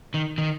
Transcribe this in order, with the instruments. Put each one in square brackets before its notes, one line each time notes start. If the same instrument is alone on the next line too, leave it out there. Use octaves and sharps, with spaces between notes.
[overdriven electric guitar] D#3
D#3